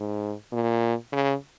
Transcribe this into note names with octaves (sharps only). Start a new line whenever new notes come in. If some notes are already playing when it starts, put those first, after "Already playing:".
Already playing: G#2
A#2
C#3